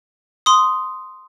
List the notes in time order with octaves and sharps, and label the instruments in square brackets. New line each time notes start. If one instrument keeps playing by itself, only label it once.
[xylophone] C6 D#6